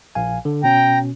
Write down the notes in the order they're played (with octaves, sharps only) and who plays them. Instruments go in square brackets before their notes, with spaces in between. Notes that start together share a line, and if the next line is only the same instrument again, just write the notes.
[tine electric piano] A#1 F5 G#5
D3
[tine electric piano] B2 C#4 [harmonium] G5 A#5